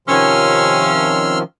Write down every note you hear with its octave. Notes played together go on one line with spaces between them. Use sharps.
C3 D#3 F3 C#4 C6 E6 F6